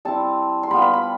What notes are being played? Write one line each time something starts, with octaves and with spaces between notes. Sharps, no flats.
G3 C4 E4 A5
C6
G3 B3 F4 B5
B5
B5